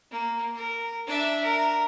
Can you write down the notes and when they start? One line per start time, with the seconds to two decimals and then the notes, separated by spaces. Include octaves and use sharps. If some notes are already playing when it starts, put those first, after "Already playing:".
0.11 A#3
0.55 A#4
1.07 D4 E5
1.44 A#4